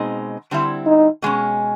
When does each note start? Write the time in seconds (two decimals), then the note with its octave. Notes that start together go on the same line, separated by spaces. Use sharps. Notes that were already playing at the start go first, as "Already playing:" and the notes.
Already playing: B2 G#3 C4 D#4
0.51 D3 G3 C4 E4
0.86 D#4
1.22 B2 G#3 C#4